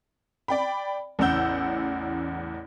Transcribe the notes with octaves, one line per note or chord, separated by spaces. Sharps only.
D5 G5 B5
A1 E2 C#3 F#5 E6 G6